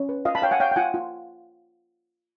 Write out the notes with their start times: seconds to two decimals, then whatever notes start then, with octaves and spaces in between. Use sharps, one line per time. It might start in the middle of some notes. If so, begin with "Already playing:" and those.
Already playing: C#4
0.09 B4
0.25 F4 D#5 F5
0.35 A5 B5
0.42 C#5 F5 G5
0.51 F#5 G#5
0.60 C#5 F5 G5
0.71 G5
0.76 F4 F#5 G#5
0.94 F4